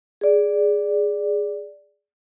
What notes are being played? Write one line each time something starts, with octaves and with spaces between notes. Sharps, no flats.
G#4 D5